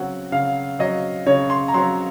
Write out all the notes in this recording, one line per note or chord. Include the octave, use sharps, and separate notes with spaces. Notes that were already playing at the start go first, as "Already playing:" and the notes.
Already playing: C#3 F#3 C4 F#5
C#3 F5
F#3 C4 D#5
C#3 C#5
C6
A#5
F#3 C4 C6